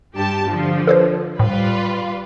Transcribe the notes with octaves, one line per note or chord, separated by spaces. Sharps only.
G2 G4 A5
D3 F3
A4 B4 C5
A2 G3 F4 B4